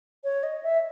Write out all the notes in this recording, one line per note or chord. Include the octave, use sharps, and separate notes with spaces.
C#5
D#5
E5